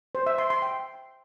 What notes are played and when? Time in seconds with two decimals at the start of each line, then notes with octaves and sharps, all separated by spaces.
0.15 C5
0.26 E5
0.38 C6
0.50 C6
0.62 G5